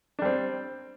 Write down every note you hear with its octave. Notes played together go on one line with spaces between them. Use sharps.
G3 C4 D4